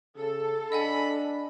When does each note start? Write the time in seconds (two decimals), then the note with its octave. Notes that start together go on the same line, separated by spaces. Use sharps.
0.17 C#3 A4
0.72 D4 D#5 F#5 G#5 B5